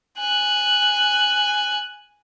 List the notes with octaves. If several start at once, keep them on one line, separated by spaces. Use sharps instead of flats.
G#5 F#6